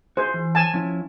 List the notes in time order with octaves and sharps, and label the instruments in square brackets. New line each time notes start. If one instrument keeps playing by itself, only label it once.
[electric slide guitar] F#4 G#4 E5 [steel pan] C5
[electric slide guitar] E3
[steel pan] G#5 A5
[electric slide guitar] F3 C#4 E4